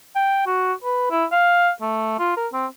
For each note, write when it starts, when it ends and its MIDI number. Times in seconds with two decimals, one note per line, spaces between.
0.16 0.41 79
0.47 0.73 66
0.84 1.08 71
1.11 1.25 64
1.32 1.70 77
1.81 2.17 57
2.19 2.36 65
2.37 2.47 70
2.53 2.66 60